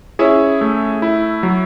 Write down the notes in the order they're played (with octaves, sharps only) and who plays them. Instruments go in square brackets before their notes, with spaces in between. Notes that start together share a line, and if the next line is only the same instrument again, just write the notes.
[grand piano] C#4 E4 [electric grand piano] G#4
[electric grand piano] A3
E4
F#3